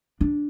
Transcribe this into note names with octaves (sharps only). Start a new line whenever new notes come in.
D4